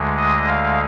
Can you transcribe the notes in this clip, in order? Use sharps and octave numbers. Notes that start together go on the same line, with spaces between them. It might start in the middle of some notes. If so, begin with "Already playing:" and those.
Already playing: D2 D3 G#3
D#5
F5